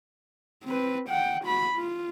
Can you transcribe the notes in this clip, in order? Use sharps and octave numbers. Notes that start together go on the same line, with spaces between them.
C4 B4
F#5 G5
F#4 B5
F4